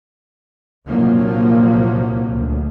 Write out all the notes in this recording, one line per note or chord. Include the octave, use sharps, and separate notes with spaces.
C2 G2 A#2 F3 F#3 A#3
D2